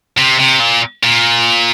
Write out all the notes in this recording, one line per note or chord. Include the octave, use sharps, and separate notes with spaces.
C3
C3
A#2
A#2